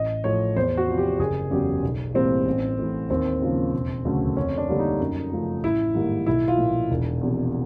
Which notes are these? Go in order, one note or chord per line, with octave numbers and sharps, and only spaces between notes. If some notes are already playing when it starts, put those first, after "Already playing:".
Already playing: A1 D#5
A2 F3 C#5
E2 C5
F#4
C3 F3
G4
F#1 G#4
E2 C#3 F#3 G4
B1
A2 E3 G3 A#3 C4
A1
A2 E3
D#2 C4
C#3 F3 A#3
E1
D2 C#3 F#3 A3
F2 C#4
D4
D3 G3 A#3
D#4
F#2
C#3 F3 A3
A1 E4
G#2 D#3 G3 A#3
B1 E4
F4
A#2 F3
E1
E2 C3 F3